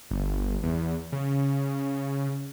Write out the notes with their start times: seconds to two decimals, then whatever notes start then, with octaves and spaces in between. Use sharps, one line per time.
0.11 G1
0.63 E2
1.12 C#3